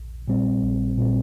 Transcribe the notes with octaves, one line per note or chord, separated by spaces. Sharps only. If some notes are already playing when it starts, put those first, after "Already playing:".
Already playing: A#1
A#2 G3 C4
A#1
A#2 G3 C4